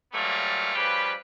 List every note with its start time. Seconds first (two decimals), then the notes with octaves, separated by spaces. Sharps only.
0.13 E3 F#3 G3 A3 A#3 F4
0.75 C#3 F3 G3 G4 B4